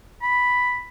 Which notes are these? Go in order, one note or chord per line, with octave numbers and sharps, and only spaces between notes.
B5